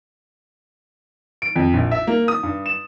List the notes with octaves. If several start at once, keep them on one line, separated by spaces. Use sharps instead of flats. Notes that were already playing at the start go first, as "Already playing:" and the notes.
D7
F2
A#1
E5
A#3
D#6
G2
E7